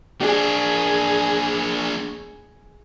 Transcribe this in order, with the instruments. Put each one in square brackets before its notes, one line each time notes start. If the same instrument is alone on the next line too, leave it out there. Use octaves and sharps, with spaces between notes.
[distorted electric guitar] A#3 D4 [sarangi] G#4